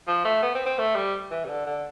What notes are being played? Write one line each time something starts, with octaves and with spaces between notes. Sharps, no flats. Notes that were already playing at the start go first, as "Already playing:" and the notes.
F3
A3
B3
C4
C4
A3
G3
E3
C3
D3
D3